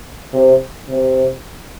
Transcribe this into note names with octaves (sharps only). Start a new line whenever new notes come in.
C3
C3